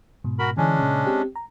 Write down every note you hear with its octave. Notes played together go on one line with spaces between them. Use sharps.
G#2 B2
F#4 A#4 B5
D3 E3 G#3 C#4 D4
A#2 C#3
C4 G4
A#5